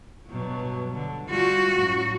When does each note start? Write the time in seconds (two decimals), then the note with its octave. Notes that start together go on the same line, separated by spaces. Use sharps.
0.28 G2 B2 F#3
0.96 D3
1.30 G3 F4 F#4
1.75 F#2 A2